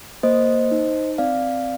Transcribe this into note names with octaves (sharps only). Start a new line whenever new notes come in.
A#3 C5 D#5
D#4
C4 D5 F5